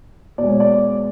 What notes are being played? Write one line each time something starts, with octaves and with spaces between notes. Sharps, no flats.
B2 G#3 D5
C#5
D5